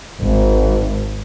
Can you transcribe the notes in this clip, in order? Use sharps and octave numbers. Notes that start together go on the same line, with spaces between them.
G#1